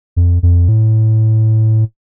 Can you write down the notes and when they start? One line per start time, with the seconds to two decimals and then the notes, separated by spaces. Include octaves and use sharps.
0.16 F2
0.43 F2
0.69 A2